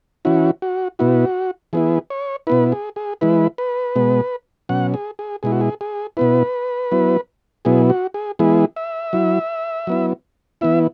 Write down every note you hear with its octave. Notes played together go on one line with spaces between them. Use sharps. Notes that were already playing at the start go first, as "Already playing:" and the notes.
E3 C#4 E4 F#4
F#4
B2 B3 E4 F#4
E3 B3 E4 G#4
C#5
B2 B3 E4 B4
G#4
G#4
E3 G#3 E4 B4
B4
B2 G#3 B3
B2 F#3 C#4 F#5
G#4
G#4
B2 G#3 E4 G#4
F#4
G#4
G#4
B2 B3 E4 B4
F#3 B3 E4
B2 F#3 B3 E4 G#4
F#4
G#4
E3 G#3 B3 E4 G#4
E5
F#3 E4
F#3 B3 E4
E3 B3 E4 E5